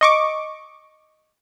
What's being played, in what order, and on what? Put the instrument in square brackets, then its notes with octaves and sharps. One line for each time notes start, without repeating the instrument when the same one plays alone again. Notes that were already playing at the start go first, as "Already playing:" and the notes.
[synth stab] D#5 C#6 D6